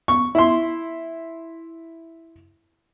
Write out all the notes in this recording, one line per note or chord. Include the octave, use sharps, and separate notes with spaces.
C#6
E4 C6